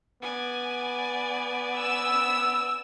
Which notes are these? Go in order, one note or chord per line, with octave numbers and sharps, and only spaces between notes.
B3 D5 G#5
E6